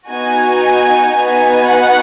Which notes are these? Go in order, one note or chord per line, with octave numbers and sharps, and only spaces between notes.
B3 D#4 F#4 G#5
G#5
B3 D#4 F#4 G#5
F#5